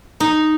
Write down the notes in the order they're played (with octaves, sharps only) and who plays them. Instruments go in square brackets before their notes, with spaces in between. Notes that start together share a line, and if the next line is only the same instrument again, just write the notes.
[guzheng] D#4